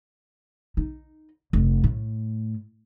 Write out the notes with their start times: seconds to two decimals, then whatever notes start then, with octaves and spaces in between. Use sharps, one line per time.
0.77 D#4
1.53 F1
1.84 A2